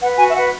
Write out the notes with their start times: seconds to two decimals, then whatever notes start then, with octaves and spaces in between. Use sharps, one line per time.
0.01 B4 F#5
0.18 F#4 G#5
0.29 E5
0.35 B4 F#5